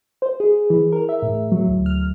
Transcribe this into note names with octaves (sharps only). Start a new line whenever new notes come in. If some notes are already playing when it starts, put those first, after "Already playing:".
C5
G#4
E3
A#4
E5
A2
F#3
D2
F6